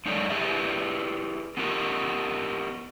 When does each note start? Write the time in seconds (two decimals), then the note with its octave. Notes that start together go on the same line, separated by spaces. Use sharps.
0.06 F#2 G#3 D#4 A4 C#5 D5
0.30 E4 G4 G#4 B4 D5 E5
1.57 B3 D#4 F4 G4 A#4